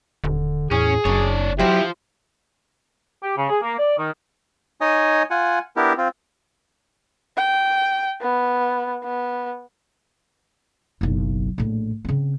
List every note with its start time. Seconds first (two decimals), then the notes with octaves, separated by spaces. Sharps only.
0.24 D#1 D3
0.71 E2 A2 C#4 G#4
1.05 F#1 F#2 D4 C#5
1.59 F#3 E4 F4 G4 C5
3.22 G4
3.37 C#3
3.49 G#4
3.62 A#3
3.79 D5
3.98 D#3
4.81 D#4 C#5 D#5 G#5 D#6
5.30 F4 F#5 G#5
5.76 B3 D4 E4 G4 A#4
5.98 C4 F4
7.37 G5
8.21 B3
9.03 B3
11.01 F#1 B1
11.58 A#1 A2
12.05 C#3 C4